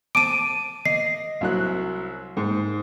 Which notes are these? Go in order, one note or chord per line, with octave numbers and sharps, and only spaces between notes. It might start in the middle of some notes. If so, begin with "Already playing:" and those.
A5 D6 D7 D#7
D#5 C7
C2 F#3 F#6
G#2